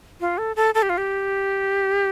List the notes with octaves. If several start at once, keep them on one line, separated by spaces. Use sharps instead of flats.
F4
A4
A4
A4
G4
F4
G4